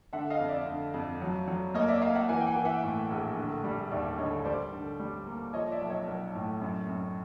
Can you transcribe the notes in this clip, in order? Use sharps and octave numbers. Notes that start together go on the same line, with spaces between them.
D3 E5 F#5
D#5 F5
F2
D5 E5
D3
F2
F#3
F#3
A#3 C#5 D#5
D5 E5
A#3 D#5 F5
E5 F#5
E3 F#5 G#5
G5
F#5 G#5
E3
E5 F#5
A2
A#1
D3
G3
D#2 D5 E5
D3 C#5 D#5
G3 C5 D5
D3
G3
A#3
F3 C#5 D#5
D5 E5
B1
C#5 D#5
B1
A2
F#2
F#2